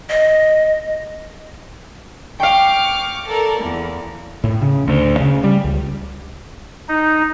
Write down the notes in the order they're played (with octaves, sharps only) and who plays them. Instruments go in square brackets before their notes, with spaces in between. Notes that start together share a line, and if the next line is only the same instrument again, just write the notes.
[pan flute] D#5
[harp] F5 G5 [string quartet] C#6 D6 F6
[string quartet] A4 A#4 D5
E2
[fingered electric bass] A2
C#3
D2
C#3
G3
C#2
[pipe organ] D#4